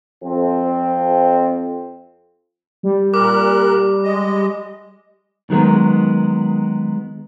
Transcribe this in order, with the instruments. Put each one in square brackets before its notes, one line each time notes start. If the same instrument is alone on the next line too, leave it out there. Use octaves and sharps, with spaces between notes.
[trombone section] F2 C4
[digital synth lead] G3
[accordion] A#2 A#4 F#6 [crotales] D6
[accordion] G#3 D#5
[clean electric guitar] D#3 F#3 G#3 B3